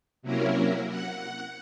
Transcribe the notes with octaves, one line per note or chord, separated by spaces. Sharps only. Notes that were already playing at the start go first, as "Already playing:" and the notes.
C3 F#3 A#3 C#4 E4 A#4
F#5